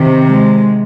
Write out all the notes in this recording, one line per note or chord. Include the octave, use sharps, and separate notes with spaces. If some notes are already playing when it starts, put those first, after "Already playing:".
Already playing: C3 D#3
G#3